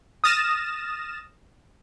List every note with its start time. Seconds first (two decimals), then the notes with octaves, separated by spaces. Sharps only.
0.24 D#6 F6 A6 A#6 E7